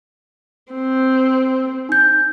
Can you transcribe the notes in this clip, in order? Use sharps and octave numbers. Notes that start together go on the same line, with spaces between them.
C4
D#4 G6